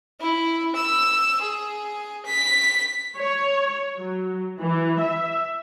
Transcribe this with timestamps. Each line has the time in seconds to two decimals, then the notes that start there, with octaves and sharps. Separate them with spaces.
0.20 E4
0.76 E6
1.42 G#4
2.26 B6
3.16 C#5
3.98 F#3
4.59 E3
5.01 E5